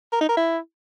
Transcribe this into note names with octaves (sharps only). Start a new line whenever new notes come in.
A#4
D#4
A#4
E4